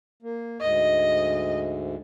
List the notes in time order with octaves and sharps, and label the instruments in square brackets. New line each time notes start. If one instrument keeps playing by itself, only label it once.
[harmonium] A#3
[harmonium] D2 G#2 [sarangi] D#5